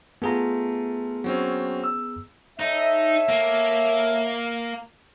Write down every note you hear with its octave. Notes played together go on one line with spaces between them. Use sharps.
A3 B3 F4 G#4 A#5
F#3 C4 C#4
E6
D#4 A4 C#5 E5
A#3